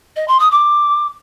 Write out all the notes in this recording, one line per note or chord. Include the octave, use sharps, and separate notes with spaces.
D#5
C6
D#6
D6